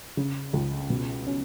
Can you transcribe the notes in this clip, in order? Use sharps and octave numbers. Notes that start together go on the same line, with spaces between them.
C#3
C#2
B2
C#4